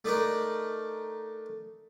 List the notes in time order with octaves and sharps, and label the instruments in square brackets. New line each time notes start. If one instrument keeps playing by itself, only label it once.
[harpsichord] A3 D4 D#4 A4 A#4 D5